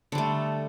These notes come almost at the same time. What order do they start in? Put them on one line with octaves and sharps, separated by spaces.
D3 G3 A3